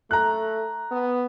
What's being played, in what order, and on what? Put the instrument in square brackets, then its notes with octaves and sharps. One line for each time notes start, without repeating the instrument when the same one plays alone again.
[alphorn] A3 [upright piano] A#5 F#6
[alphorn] B3